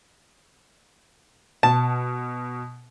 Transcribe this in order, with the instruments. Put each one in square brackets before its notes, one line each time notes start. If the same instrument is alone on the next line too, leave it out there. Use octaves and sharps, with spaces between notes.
[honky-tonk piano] B2 [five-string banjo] A5